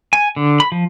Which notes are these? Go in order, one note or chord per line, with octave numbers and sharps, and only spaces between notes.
G#5
D3
B5
F3